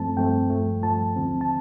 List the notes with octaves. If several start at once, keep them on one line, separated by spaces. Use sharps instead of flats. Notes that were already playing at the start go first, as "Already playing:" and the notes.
Already playing: G2 F3 A3 C4 A5
G2 F3 A3 C4 G5
G2 F3 A3
G2 F3 A3 A5
D#2 D3 F3 C4
A5